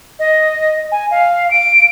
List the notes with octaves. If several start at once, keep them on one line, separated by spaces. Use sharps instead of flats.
D#5
G#5
F5
D7